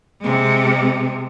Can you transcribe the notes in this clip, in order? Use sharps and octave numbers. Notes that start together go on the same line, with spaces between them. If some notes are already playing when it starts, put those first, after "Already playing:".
C3 G#3